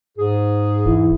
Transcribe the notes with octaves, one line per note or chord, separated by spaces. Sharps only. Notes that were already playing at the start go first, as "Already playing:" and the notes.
G#2 G#4
E1 E3